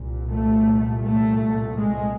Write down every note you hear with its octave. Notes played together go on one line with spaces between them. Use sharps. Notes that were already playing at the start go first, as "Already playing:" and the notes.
Already playing: C2 A#2
A3
A3
G#3